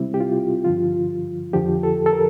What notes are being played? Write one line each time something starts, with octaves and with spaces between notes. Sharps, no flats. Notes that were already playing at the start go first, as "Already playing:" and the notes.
Already playing: C3 G3 C4 E4
G4
F4
G2 D3 F3 F4
F2 D3 F3 G4
A4
A4
A#4